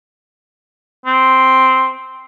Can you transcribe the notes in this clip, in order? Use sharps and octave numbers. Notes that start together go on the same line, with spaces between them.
C4